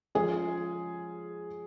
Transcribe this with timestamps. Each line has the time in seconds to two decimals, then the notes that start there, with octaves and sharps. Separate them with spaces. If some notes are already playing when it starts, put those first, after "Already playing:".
0.15 F3 G#3 C#4 G#4